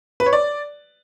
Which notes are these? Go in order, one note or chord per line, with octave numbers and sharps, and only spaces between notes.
B4
C#5
D5